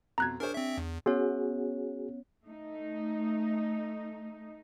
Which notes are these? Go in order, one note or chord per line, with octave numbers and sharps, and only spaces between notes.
F2 B2 A#5 F#6 G#6
D4 G#4 A#4 C5 C#5
C4 E5
E2
B3 C#4 F#4 G#4 C#5
A3 D#4